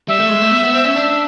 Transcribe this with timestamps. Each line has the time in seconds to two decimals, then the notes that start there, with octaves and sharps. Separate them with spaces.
0.08 G3 E5
0.20 A3
0.29 G#3
0.41 A3
0.51 B3
0.63 B3
0.73 C4
0.84 C#4
0.96 D4